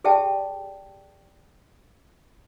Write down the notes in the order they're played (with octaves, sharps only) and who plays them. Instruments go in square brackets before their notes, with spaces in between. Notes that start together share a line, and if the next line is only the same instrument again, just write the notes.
[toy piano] G4 G#4 D5 E5 G5 A5